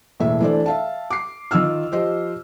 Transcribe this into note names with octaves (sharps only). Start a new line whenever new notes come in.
E1 A2 A#3 E5
E3 A3 D4 A4 C5 D5
E5 F5 A5
D6 C7
D#3 D#4 F4 E6 F6
F3 G4 C5 D#5